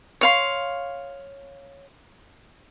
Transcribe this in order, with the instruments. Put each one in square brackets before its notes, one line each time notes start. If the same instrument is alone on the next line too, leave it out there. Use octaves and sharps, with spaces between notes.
[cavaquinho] C#5 F5 C6